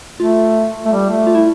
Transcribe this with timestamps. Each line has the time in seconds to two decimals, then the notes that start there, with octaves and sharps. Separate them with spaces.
0.19 A3 F4
0.85 A3
0.92 G3
1.09 A3
1.27 F4
1.35 E4